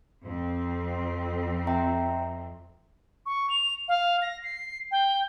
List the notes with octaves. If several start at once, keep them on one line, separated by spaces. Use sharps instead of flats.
F2 C4
E5 G5 A#5
C#6
F7
F5
A#6
C7
G5